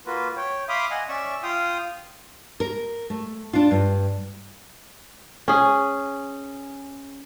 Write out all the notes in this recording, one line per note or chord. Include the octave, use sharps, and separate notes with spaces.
A#3 F4 F#4 B4
C#5 G5
E5 F5 B5 C6 D6 D#6
D#5 F#5 G#5
C#4 D5 E5 C#6 E6
F4 F5 G5 D#6
A#4
A3
D4 F4
G2
C#4 G#4